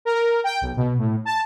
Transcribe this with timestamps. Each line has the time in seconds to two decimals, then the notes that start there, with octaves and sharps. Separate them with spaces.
0.05 A#4
0.44 G5
0.61 B1
0.77 B2
0.98 A2
1.25 A5